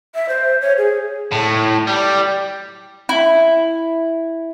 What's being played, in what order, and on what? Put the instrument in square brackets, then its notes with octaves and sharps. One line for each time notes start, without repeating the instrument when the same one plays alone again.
[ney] E5
C5
C#5
G#4
[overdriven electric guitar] A2
G3
[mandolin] E4